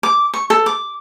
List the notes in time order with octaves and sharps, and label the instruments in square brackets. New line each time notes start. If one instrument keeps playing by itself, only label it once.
[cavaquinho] D6
C#6
A4
D6